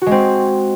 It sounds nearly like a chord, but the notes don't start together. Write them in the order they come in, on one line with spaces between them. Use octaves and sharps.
F#4 G#3 C4